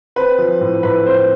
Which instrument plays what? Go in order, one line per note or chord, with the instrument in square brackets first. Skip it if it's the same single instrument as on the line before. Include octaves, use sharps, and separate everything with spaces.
[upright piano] C4 B4
F3
A2
A2 B4
C4 C5